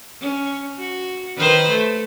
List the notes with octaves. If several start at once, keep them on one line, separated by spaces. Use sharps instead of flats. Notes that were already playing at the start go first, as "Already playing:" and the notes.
C#4
F#4
D#3 B4 C5
A3